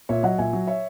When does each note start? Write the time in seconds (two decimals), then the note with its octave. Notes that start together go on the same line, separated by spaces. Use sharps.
0.09 A#2 C#5 E5
0.23 F#3 D#5 F#5
0.38 A#2 E5 G#5
0.53 F#3
0.67 C#5 E5